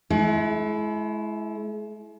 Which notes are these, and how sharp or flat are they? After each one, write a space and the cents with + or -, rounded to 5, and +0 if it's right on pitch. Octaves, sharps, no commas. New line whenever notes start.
G#3 +45 E4 +5